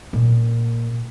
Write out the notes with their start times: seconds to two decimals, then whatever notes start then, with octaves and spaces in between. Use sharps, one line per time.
0.13 A#2